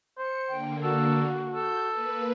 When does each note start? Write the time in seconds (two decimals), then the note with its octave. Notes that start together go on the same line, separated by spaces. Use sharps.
0.18 C5 C#7
0.48 D3 A#3 G5
0.83 F#4 A4
1.55 A4 G6
1.91 A#3 B4